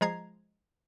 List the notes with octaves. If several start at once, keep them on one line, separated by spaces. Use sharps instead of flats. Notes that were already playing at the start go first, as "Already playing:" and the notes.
F3 G#3 A#5 G#6 C7